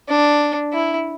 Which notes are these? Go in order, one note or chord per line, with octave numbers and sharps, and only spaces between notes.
D4
E4